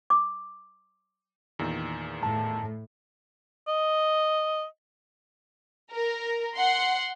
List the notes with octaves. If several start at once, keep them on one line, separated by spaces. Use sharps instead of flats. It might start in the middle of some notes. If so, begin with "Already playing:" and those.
D6
E2 A#2 D#3
A2 A5
D#5
A#4
F#5 C6